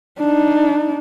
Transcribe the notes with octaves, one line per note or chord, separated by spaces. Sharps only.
D4 D#4